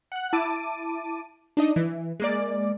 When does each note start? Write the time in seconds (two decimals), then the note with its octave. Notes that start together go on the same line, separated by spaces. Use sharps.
0.12 F#5 F#6
0.33 E4 A5 D6 D#7
1.57 D4 D#4 D#5
1.76 E3
2.20 G#3 A#3 D5